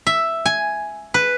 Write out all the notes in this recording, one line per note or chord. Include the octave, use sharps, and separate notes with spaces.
E5
G#5
B4